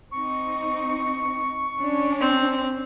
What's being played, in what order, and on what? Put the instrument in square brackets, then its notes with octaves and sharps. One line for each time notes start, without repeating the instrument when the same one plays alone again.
[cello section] C4 D#4 [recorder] C#6
[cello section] C#4 D4
[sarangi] C4 [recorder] C6